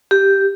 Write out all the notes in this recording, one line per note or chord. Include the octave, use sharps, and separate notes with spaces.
G4